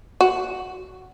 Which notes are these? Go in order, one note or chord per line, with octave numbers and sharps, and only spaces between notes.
F#4